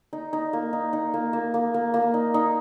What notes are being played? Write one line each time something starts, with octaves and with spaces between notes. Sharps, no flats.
D#4
D#4
A#3
D#4
D#4
A#3
A#3
A#3
A#3
A#3
D#4
D#4